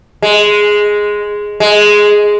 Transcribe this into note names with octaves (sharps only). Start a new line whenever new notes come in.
G#3
G#3